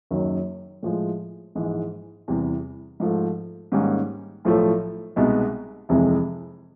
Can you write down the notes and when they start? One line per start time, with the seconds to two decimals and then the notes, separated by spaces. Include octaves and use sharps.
0.11 F#1 F#2 D#3 F#3
0.83 A2 F3 G#3
1.55 A#1 G#2 E3 G#3
2.28 E2 C3 E3 G3
3.00 G#2 F3 A3
3.72 G#2 D#3 G3 A#3 C#4
4.45 B1 A2 F3 A3
5.16 C2 B2 G#3 B3 D#4
5.89 F1 F2 C3 E3 G#3